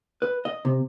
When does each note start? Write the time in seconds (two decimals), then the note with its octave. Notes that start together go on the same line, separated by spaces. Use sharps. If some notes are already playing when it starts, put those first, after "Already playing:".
0.22 B4
0.45 D#5
0.65 C3